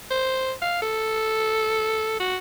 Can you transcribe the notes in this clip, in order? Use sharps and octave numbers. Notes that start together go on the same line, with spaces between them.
C5
F5
A4
F#4